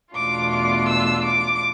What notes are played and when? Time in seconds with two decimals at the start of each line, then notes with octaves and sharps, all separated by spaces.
0.14 E2 B2 A3 D4 F4 D6
0.52 D6
0.88 E6
1.25 D6